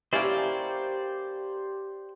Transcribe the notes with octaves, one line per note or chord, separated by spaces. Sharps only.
A#3 C#4 E4 G4 C5 D5